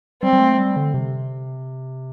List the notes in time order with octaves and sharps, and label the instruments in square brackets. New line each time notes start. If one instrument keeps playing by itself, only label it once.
[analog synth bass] G3 [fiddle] C4
[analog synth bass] G3
A3
G3
D3
C3